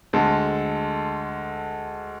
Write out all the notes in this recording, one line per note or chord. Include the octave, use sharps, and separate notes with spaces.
D2 G#3 A4 A5